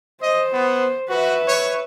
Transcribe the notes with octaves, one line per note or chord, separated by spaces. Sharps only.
C5 D#5
B3
F#4 B4 E5
C#5